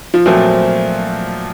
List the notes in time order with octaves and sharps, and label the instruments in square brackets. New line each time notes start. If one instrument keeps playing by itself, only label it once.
[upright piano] F3
[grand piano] A#2 F3 A3 C4 [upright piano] F#3